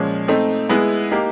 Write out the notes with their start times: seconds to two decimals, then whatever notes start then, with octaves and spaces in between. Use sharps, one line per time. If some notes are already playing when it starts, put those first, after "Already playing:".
Already playing: A#2 F3 G#3 C#4
0.28 A3 C4 D#4
0.69 G#3 B3 E4 G#4
1.11 A#3 D#4 G4